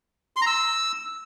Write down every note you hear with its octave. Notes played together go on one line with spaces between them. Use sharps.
C6
A#5
E6